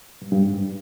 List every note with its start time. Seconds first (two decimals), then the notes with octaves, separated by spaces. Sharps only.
0.22 G2
0.32 G2
0.42 G#2